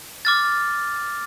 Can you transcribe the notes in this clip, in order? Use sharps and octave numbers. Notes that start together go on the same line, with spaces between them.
D6 F6 A6